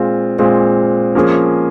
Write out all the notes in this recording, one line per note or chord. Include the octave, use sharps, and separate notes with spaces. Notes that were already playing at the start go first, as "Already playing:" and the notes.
Already playing: A#2 G#3 C4 F4
A#2 G#3 C4 F4
F3 A#3 C#4 G#4